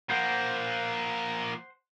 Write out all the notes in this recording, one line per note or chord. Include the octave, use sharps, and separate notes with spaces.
F3 A#3 C5 F#5